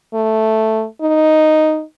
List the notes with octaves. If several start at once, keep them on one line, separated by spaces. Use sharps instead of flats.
A3
D#4